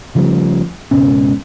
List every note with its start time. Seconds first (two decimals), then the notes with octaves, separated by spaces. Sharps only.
0.15 C#3 F3 G3 A3
0.91 C#2 G#2 B2 C#4